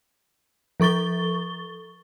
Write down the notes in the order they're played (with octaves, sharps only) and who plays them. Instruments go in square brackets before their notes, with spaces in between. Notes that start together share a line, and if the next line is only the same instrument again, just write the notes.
[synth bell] F3 A4 C#6 A6 G7